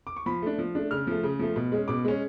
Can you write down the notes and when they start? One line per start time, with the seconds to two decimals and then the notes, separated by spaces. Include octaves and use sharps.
0.07 D6
0.16 C#6
0.26 F3 B5
0.42 A3 D4
0.58 F3
0.75 A3 D4
0.91 C#3 F6
1.07 F3 A3
1.23 C#3
1.39 F3 A3
1.56 B2
1.72 G#3 C#4
1.88 B2 D6
2.04 G#3 C#4